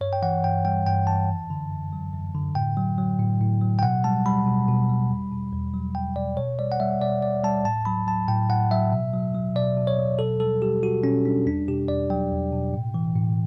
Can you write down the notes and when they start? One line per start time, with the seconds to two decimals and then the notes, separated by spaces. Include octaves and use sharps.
0.01 G2 C#5
0.13 G5
0.22 E3 F#5
0.44 G2 G5
0.65 G3 G5
0.86 G2 G5
1.07 E3 A5
1.29 F#2
1.50 D3
1.71 F#2
1.93 F#3
2.13 F#2
2.34 D3
2.55 A2 G5
2.77 F#3
2.98 F#3
3.19 A2
3.41 A2
3.61 F#3
3.79 G5
3.83 B2 F#5
4.04 G3 A5
4.26 G3 B5
4.46 B2
4.68 B2
4.89 G3
5.10 E2
5.31 B2
5.52 E2
5.74 F#3
5.95 E2 G5
6.16 B2 D5
6.37 B2 C#5
6.59 G3 D5
6.72 F#5
6.80 G3 E5
7.01 B2 D5
7.22 B2 D5
7.43 G3 A5
7.65 A2 A5
7.85 F#3 B5
8.07 F#3 A5
8.28 A2 G5
8.49 A2 F#5
8.71 F#3 E5
8.92 B2
9.14 F#3
9.35 F#3
9.55 B2 D5
9.77 B2
9.87 C#5
9.99 F#3
10.19 B2 A4
10.40 G3 A4
10.62 G3 G4
10.83 B2 F#4
11.03 B2 C#4
11.25 G3 D4
11.46 E2 D4
11.68 B2 G4
11.88 E2 D5
12.10 F#3 G5
12.32 E2
12.53 B2
12.74 A2
12.94 E3
13.16 A2